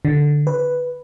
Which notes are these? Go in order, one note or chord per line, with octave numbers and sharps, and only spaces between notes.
D3
B4